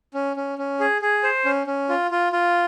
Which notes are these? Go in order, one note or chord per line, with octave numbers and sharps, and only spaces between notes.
C#4
C#4
C#4
G#4
G#4
C5
C#4
C#4
F4
F4
F4